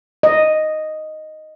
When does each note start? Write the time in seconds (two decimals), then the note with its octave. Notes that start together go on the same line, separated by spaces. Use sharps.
0.23 D#5